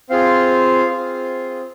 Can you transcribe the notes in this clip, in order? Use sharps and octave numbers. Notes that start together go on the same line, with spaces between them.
C4 F4 G#4 F5
C4 F4 G#4